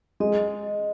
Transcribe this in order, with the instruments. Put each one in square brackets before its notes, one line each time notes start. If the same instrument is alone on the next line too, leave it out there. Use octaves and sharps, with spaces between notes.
[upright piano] G#3 [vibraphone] D#5